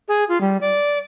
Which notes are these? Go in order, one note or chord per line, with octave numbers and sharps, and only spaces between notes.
G#4
F4
G3
D5